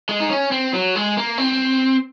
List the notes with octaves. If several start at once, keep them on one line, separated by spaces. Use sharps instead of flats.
G#3
D#4
C#4
C4
F#3
G#3
A#3
C4